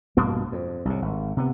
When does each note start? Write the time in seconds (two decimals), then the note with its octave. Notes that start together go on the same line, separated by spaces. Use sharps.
0.17 A#1 G2 B2 A#3
0.52 F2
0.85 C2 A2
1.02 G#1
1.37 C3 B3